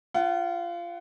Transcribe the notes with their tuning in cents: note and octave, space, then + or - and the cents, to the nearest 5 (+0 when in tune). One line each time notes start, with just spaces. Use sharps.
F4 -20 F#5 +20